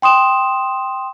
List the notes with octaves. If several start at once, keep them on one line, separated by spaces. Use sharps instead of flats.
G5 C6 D#6 E7